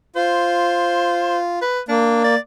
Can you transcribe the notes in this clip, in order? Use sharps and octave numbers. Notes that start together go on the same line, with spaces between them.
F4 C5
B4
A#3 D4
D5